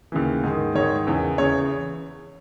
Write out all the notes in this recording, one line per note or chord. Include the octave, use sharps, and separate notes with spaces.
D#2 C#3 E3
G#2 D#3
G#2 D#3 C#5
E2 C#3 E3
E2 C#3 E3 C#5